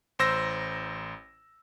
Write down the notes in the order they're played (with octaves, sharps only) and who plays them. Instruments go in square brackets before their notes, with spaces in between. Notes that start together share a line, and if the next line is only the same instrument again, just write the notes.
[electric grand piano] A1 C5 E6 A#6